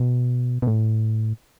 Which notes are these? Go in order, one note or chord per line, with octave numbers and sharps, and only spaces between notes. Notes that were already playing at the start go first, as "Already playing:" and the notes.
Already playing: B2
B2
A2